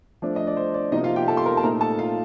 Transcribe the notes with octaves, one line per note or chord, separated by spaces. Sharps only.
F3 A3 D4
D#5
D5
C5
D5
C3 F3 A#3 D#4 D#5
F4 F5
G4 G5
A4 A5
C6
A#4 A#5
A5
A#2 A3 D#4 A#4 A#5
A4 A5
F4 F5